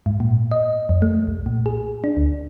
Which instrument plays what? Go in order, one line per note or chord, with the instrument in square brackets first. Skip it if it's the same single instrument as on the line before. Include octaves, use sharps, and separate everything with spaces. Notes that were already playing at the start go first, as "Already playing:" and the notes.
[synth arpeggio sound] G#2
A#2
D#5
F2
A3
B1
A#2
G#4
D4
D2